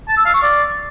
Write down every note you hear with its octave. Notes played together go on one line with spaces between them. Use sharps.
A5
E6
F5
C#6
D5